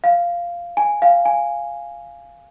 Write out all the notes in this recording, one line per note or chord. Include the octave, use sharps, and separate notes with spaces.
F5
G#5
F5
G#5